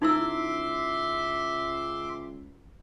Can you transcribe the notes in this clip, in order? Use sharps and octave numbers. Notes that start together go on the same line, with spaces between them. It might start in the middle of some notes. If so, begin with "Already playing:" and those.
C#2 D#4 E4 E5 C6 D6 E6